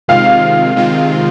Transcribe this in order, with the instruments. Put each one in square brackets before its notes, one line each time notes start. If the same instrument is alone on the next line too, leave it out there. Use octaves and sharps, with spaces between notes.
[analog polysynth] C3 D#3 G#3 C4 F4 [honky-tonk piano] F5
[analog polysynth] C3 D#3 G#3 C4 F4